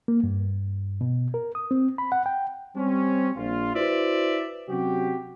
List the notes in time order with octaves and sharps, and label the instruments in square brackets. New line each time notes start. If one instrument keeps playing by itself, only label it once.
[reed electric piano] A#3
G2
B2
A#4
D#6
C4
B5
F#5
G5
[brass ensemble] G3 C4 C#4
A#1 F4
E4 F#4 B4 C5 D5 E5
C3 F#3 C#4 F#4 G4